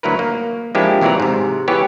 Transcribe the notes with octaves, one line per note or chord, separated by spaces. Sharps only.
D2 F#3 E4 A#4 B4
A#3
F3 G#3 A#3 D4 E4 G4
D#2 C3 E3 F#3 D5 A#5
G#2 C3
E3 B3 E4 G4 G#4 C#5